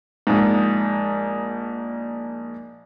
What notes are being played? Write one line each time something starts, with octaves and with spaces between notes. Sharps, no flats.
A#1 G#2